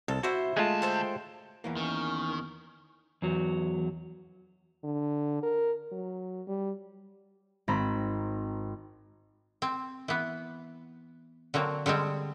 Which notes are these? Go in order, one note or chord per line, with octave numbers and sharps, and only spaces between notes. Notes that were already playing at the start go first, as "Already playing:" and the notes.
C2 A4
E4 F#4 C5
D2 G#3 A3 F4 A5
A4 C5 G5
E2 E3 A#3
D#3 C#4
E2 F#3
D3
A#4
F#3
G3
G#1 C4 A#5 B5
C4
E3 B3
D3 F#3 A#3 C4
D3 G3 G#3 C4